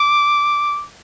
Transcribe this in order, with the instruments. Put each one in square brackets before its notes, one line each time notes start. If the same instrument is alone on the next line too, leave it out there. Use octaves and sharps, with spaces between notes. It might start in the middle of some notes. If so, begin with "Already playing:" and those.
Already playing: [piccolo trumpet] D6